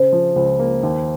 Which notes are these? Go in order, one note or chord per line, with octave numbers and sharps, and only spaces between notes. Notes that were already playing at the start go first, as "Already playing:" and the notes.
Already playing: C#3 C5
F3
C#2 C5
A#3
D#2